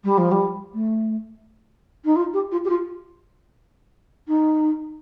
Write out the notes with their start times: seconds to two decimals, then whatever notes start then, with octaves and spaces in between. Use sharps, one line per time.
0.04 G3
0.18 F3
0.31 G3
0.74 A3
2.05 D#4
2.16 F4
2.33 G4
2.52 F4
2.65 G4
2.69 F4
4.28 D#4